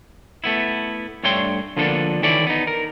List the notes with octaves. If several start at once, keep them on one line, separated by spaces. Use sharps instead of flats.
A3 B3 E4
G2 A3 D4 C#5 G5 C6
D3 F3 A#3 B3 D4 A4
D#3 E3 E4 A4 C#5 D5
B3 D#4
A#4